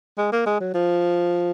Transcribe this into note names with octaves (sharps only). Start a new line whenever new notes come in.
G#3
A#3
G#3
F#3
F3